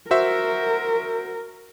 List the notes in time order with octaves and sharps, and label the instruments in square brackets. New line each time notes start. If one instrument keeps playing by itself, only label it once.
[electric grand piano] F#4 C5 E5 [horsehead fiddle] A#4